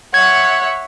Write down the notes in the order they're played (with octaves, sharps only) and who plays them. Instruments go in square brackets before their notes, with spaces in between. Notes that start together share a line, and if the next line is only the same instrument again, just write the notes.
[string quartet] C#5 E5 F#5 [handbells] G#6